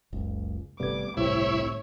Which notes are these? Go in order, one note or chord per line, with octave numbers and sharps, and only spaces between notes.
F#1 C#2
G1 C3 G3 A3 B3 D6 G#6
G1 C2 A2 C3 C4 E4 C#5